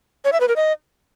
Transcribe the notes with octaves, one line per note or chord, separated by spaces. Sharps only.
C#5
E5
B4
A#4
D#5